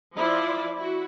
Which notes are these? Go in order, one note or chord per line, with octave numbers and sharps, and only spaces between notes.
F3 E4 F4 D5
E4 F#4